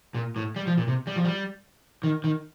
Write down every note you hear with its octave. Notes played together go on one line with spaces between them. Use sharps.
A#2
A2
G3
F3
A#2
C3
G3
F3
G3
D#3
D#3